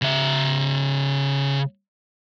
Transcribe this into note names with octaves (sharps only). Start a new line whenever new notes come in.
C#3 E5